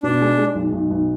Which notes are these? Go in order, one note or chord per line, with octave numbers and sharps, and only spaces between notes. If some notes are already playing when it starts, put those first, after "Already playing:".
B2 D4
G#3
G#3
B1
B1
B1